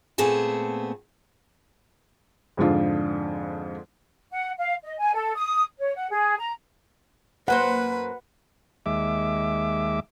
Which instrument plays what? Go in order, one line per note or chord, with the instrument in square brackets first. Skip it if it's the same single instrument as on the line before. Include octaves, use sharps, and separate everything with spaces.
[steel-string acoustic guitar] A#2 A3 B3 C4 G#4 A5
[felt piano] F2 G#2 D3 D4 F4
[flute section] F#5
F5
D#5
G#5
A4
D#6
C#5
F#5
G#4
A#5
[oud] F#2 A#3 C5 [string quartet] B4 [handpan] F#5
[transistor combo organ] D#2 G#3 E5 D6